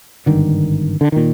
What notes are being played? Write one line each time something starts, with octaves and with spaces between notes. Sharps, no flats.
G#1 G2 D3 D#3
D3
A#2 D#3